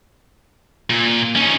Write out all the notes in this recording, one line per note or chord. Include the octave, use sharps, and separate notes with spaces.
A#2
C#4 D#4